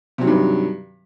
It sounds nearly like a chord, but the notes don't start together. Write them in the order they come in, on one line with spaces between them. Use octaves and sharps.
C3 F#3 D#3 G2